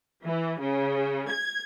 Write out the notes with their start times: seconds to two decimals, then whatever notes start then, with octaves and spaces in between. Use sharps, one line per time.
0.24 E3
0.60 C#3
1.29 G#6